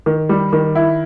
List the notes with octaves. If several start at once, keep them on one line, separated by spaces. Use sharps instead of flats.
D#3
G3
D#3
E4